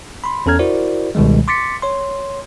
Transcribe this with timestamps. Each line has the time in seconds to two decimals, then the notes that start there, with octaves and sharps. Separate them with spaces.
0.24 B5 C6
0.46 E2 C#4 A4 A#5 F6 G#6
0.59 E4 F#4 A#4 C5 D5
1.15 C#2 B2 D#3 G3 G#3
1.48 C6 D6 A6 B6 C#7
1.82 C#5 C6